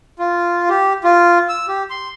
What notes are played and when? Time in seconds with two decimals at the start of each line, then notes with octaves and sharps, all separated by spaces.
0.19 F4
0.69 G4
1.04 F4
1.49 E6
1.68 G4
1.90 C6